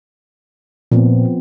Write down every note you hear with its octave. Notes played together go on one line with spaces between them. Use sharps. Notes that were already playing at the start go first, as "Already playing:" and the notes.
A#2 F3 B3 C4